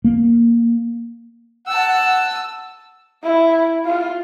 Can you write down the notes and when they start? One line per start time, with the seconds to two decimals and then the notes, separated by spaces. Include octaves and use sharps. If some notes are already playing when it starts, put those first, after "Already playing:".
0.04 A#3
1.67 F#5 A5 E6
3.23 E4
3.85 F4